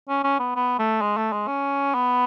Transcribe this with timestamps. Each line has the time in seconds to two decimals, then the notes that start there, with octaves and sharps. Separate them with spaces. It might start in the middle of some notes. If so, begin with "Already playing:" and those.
0.09 C#4
0.24 C#4
0.39 B3
0.56 B3
0.79 A3
1.02 G#3
1.17 A3
1.32 G#3
1.47 C#4
1.94 B3